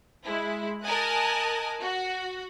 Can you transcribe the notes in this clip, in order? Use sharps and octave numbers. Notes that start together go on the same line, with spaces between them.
G#3 E4
A#4 D#5 G#5 A5 D#6 F#6
F#4